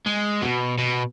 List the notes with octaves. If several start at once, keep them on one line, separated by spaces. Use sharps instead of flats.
G#3
B2
B2